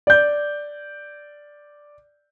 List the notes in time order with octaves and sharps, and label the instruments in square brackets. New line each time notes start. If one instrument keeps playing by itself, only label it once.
[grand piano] D5 G6